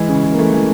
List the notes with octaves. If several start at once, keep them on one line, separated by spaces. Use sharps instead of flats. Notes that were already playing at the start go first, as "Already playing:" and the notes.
Already playing: E3 G#3
C#3
C#3
A#3
E3 A3
E3